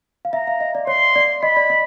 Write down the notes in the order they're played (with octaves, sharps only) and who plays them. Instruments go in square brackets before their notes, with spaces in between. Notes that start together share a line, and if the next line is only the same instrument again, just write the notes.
[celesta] F5
[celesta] E5 [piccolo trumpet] A#5
[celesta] F5
D#5
D5
[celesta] C#5 [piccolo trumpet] C6
[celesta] D5
[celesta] D#5 [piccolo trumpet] B5
[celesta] D5
D#5